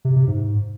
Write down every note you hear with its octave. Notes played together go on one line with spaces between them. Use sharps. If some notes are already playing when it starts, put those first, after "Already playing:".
C3
C3
G#2